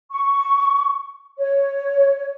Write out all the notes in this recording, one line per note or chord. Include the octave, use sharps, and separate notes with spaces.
C#6
C#5